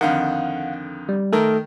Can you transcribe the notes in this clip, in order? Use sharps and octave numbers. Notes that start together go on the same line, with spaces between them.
F2 D3 D#3 F5 F#5
G3
D#3 A3 A4 A#4